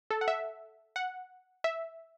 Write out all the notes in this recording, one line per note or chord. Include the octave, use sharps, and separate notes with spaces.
A4
F#5
E5
F#5
E5